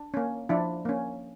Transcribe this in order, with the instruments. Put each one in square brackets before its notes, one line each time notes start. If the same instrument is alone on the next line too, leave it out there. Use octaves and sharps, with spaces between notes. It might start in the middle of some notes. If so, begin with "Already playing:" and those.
Already playing: [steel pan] D4
A#3 C#4
F3 D4 E4
A#3 C#4